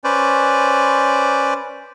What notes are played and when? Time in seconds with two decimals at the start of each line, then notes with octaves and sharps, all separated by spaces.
0.04 C#4 B4 C5 D5